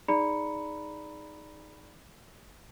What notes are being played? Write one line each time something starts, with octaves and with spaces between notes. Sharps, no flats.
D#4 G#4 D5 A#5 B5 C#7